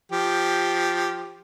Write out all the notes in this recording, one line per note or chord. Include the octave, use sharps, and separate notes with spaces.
F3 G4